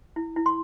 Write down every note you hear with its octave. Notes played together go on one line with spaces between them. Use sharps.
E4
E4
C6